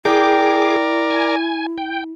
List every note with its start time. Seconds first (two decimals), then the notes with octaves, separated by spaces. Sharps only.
0.05 E4 G#4 A#4 D5 G5 D6
1.10 G#5
1.78 G5